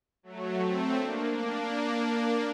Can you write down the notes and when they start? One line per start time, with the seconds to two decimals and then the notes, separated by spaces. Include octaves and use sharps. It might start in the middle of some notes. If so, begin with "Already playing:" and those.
0.23 F#3 A3
0.60 A3 C4
0.95 A#3 D4
1.32 A#3 D4